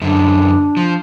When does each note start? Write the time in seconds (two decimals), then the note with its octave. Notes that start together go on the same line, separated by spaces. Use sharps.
0.01 F#2 D3 D4
0.77 F3